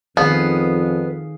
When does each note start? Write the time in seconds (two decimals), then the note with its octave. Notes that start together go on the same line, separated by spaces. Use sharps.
0.17 F2 D#3 B3 G#4 B4 F5